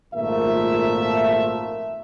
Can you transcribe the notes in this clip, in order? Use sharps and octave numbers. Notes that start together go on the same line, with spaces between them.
G#1 A#2 F3 A3 A#4 E5